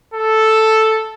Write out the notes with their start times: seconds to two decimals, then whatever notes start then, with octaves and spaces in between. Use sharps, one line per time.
0.14 A4